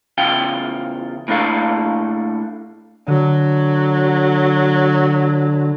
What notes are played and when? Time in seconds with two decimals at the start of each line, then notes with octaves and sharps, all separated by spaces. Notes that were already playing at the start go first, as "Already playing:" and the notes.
0.18 E2 C#3 F4 F5 G5
1.28 A2 A#3 D4 A4 F5
3.08 D3 F#3